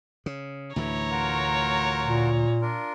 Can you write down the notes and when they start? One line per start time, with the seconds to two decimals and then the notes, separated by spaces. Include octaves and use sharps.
0.26 C#3
0.76 D2 A2 E3 E4 C#5 A#5
1.10 F4 F#4 A#4
2.03 A#2
2.61 D4 F4 A#4